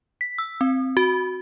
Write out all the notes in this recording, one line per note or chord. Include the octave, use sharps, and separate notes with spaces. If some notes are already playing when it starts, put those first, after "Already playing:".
B6
E6
C4
F#4